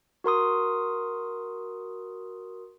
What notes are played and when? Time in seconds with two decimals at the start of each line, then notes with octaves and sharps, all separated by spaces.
0.24 F#4 A#4 C6 D#6